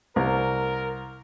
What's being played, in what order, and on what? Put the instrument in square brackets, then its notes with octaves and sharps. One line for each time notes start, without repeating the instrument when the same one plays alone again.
[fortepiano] C2 [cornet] A#4